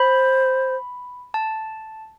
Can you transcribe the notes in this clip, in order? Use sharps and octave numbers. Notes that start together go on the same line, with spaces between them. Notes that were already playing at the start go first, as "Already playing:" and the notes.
Already playing: C5 B5
A5